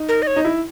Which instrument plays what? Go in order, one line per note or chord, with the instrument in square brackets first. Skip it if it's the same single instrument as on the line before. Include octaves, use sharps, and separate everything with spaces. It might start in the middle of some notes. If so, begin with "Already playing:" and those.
Already playing: [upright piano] D#4
[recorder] A#4
D#5
C#5
[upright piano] D#4
E4